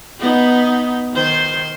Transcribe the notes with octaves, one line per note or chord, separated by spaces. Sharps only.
B3 D#4
D#3 C5